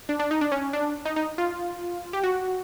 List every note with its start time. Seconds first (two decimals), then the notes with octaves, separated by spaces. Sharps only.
0.09 D4
0.19 D4
0.31 D#4
0.41 D4
0.52 C#4
0.73 D4
1.05 D#4
1.16 D#4
1.38 F4
2.13 G4
2.24 F#4